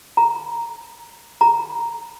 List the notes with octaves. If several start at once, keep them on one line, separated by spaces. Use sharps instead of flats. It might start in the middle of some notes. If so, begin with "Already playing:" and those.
A#5
A#5